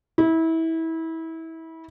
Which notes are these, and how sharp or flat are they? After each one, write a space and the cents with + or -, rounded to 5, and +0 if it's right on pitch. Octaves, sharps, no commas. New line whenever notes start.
E4 -25